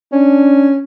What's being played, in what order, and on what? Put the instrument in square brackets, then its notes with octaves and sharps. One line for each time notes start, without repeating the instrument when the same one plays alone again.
[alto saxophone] C#4 [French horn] D4